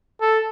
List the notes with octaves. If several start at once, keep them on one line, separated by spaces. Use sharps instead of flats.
A4